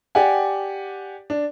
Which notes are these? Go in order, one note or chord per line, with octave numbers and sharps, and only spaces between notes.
G4 D5 F#5 G#5
D4